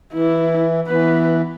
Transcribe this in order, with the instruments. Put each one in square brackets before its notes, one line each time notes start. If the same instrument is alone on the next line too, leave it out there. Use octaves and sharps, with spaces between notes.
[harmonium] E3 [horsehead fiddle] E4
[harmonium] E3 [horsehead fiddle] B3 B4